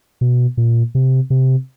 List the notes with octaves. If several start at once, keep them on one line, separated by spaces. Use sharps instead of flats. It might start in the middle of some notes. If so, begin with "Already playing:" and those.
B2
A#2
C3
C3